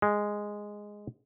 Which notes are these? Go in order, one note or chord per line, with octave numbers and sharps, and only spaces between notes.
G#3